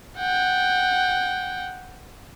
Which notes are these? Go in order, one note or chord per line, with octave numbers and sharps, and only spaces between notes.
F#5 G5